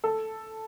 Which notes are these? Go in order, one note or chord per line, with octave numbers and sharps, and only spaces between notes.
A4